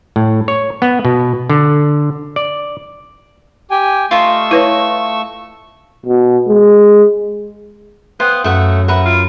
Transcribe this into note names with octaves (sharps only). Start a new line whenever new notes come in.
A2
C#5
B3
B2
D3
D5
G4 G5 G#5
A3 F4 D#5 C6 C#6 E6
E4 B4 C#5
B2
G#3
B3 C5 F5 G5 D#6
F#2 A3 A4 E5 F#5
A#4 B4 E5 F#5
F4